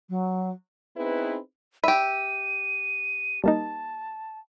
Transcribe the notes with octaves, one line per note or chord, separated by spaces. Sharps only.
F#3
B3 C4 D#4 E4 G#4 B4
G4 E5 B5 D#7
G3 A#3 D#4 A5